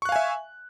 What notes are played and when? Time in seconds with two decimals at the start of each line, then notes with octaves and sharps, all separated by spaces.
0.02 C#6
0.05 F#6
0.09 F5
0.12 G#5
0.16 E5